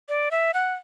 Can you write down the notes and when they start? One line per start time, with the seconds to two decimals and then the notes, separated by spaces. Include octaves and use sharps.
0.09 D5
0.31 E5
0.54 F#5